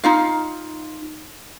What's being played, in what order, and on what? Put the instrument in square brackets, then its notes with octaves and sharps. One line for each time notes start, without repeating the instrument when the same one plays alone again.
[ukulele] D#4 F4 F5